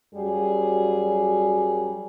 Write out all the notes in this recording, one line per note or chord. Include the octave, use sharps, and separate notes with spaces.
F#2 F#3 G3 G#4